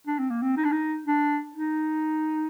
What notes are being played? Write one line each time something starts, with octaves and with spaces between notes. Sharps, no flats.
D4
C4
A#3
C4
D#4
D4
D#4
D4
D#4